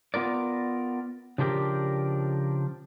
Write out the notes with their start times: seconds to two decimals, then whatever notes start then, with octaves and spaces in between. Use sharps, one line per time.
0.14 B3 F4 A#4 D5
1.38 C#3 F3 D4 G4 A#4